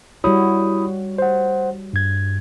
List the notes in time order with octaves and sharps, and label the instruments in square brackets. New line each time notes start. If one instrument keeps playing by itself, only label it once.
[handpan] G3 F#4 C#5 [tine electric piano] E4 B5 D#6
[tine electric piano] C5 F#5
G2 G#6